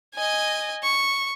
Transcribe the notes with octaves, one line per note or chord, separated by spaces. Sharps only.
D#5 G#5
C#6